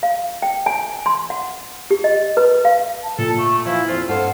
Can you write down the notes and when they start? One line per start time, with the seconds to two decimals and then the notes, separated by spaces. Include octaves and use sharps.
0.03 F5
0.42 G5
0.66 G#5
1.06 C6
1.30 F#5
1.91 G4
2.04 D#5
2.37 B4
2.65 F5
3.03 A5
3.18 A#2 A4
3.38 A3 C#6
3.66 E3 F3 E4 F5
3.88 F2 F4 C5
4.08 G2 A4 C5 F5 F#5